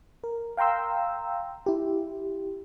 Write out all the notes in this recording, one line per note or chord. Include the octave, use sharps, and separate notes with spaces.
A#4
F5 G5 A#5 C6 E6
E4 G4